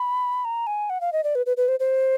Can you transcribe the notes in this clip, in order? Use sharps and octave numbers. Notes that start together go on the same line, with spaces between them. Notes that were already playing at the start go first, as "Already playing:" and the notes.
Already playing: B5
A#5
G#5
F#5
F5
D#5
D5
B4
B4
B4
C5
C5